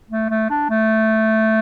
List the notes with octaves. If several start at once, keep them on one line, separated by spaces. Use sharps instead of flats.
A3
A3
D4
A3